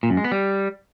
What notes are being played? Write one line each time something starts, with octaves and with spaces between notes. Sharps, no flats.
A#2
F#2
G#3
B3
G3